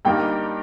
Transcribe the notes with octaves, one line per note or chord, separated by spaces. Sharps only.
G2 G3 A#3 D#4 G5